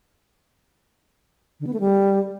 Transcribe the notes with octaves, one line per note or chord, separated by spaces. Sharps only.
D3
B3
A3
G3